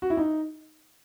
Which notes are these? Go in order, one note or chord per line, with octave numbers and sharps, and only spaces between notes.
F#4
E4
D#4